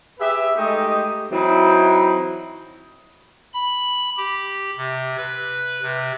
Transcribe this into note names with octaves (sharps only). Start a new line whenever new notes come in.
G4 G#4 B4 E5
G#3 A3 D#4 G4 D#5
E3 F#3 C4 D#4 E4
B5
G4
C3
B4
C3